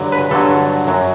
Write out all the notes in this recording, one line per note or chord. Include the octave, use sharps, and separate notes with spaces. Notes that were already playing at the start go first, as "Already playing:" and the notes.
Already playing: G2 D3 F#3
B4
G2 D3 F#3 A4
F#2 F#3